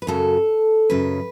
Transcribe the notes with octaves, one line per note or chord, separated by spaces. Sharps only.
B4
F#2 C#3 F#3 A4
F#2 C#3 F#3 B4